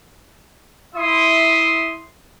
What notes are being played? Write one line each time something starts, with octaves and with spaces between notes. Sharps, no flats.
E4 E5 C6 D#6